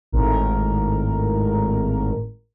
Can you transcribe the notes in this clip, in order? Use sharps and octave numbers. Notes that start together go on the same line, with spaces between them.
G#1 A2 A#4